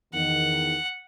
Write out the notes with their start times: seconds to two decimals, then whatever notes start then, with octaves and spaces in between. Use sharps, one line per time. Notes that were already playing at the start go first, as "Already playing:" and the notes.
0.14 E2 D#3 F#5